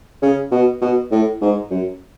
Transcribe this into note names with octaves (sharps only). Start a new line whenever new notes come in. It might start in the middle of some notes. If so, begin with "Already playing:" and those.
C#3
B2
B2
A2
G#2
F#2